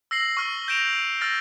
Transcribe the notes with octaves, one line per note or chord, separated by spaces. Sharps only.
E6 A#6 C7 F#7
C#6 F6
G6 A#6 D7 E7 F7
E6 F6 A6 A#6